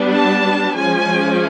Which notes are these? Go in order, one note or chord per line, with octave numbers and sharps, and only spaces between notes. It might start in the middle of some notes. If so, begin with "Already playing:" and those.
Already playing: G3 B3 D4
A5
F3 G#3 C#4 G#5